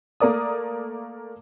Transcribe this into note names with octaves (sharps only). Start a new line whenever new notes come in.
A3 A#3 A#4 D5 D#6